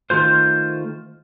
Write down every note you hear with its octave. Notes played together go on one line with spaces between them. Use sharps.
D#3 A3 F4 C5